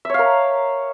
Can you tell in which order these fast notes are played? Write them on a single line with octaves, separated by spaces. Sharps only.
E5 C#5 F5 A#4